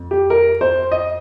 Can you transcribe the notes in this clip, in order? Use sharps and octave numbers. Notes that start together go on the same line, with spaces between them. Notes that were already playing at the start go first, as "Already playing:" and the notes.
Already playing: F2
G4
A#4
C5
D#5